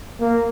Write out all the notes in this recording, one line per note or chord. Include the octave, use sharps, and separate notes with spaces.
A#3